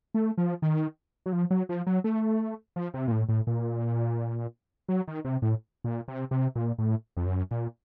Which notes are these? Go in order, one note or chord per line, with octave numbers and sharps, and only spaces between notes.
A3
F3
D#3
F#3
F3
F#3
F3
F#3
A3
F3
C3
A#2
A2
A2
A#2
F#3
D#3
C3
A2
A#2
C3
C3
A#2
A2
F2
F#2
A#2